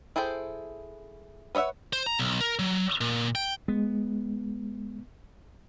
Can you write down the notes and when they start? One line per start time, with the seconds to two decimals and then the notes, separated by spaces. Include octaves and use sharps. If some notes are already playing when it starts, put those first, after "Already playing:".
0.16 E4 G#4 A4 C5 G5
1.55 B4 C#5 D#5 E5 F#5
1.93 C5
2.06 A#5
2.19 B1
2.41 A#4
2.59 F#3
3.01 A#2
3.35 G5
3.68 G#3 B3